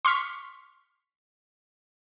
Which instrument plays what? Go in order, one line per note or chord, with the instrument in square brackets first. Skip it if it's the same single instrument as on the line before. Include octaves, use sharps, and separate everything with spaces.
[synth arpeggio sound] C6 C#6 F6 B6